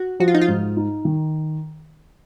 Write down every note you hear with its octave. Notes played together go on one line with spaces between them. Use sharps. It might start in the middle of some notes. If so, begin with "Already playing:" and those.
Already playing: F#4
F3 F#4
F4
D#4
F4
G#2
D#4
D#3